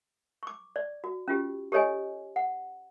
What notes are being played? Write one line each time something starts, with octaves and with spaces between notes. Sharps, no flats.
C#6 D6
D5
F#4
C#4 F4 G4
G4 A4 C#5 D#5 G#5
F#5